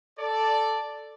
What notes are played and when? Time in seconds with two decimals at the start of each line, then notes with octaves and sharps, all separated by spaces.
0.19 A4 D5